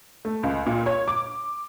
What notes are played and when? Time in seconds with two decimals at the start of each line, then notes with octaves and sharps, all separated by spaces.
0.25 A3
0.43 C#2
0.66 A#2
0.86 C#5
1.08 D6